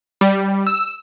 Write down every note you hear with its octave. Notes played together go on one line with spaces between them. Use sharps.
G3
E6